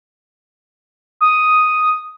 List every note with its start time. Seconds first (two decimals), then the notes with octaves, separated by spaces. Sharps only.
1.21 D#6